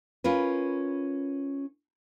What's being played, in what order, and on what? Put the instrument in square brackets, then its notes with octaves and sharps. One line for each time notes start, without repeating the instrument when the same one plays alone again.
[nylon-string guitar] C#4 F4 A#4 B4